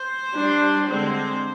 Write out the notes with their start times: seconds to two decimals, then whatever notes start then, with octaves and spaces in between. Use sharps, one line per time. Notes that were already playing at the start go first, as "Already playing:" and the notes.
Already playing: C5
0.34 G3 D4
0.89 D3 G#3 C4 C5